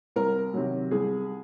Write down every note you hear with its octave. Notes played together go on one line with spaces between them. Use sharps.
C2 A#4
C3 D#3 F#3
C2 G#4